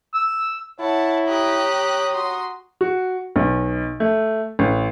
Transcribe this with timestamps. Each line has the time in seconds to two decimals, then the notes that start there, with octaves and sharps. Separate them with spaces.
0.15 E6
0.80 E4 C#5 F#5 A5
1.28 G4 A#5 D#6 F#6
2.14 F#4 C6
2.81 F#4
3.36 B1
4.00 A3
4.59 A1